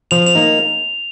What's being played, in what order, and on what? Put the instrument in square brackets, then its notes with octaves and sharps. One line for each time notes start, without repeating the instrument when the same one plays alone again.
[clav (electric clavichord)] F3 [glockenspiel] F7
[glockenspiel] F7
[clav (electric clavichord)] A#3 D#4